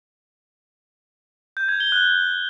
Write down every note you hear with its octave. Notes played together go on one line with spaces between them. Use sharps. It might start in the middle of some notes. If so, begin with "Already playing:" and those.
G6
G#6
G7
F#6